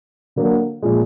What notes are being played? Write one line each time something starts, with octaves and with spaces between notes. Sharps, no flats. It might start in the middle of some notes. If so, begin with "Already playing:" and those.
D3 F#3 A#3
A#2 F3 G#3